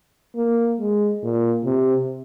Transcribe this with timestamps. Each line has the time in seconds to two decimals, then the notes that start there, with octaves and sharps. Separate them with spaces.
0.36 A#3
0.79 G#3
1.23 A#2
1.65 C3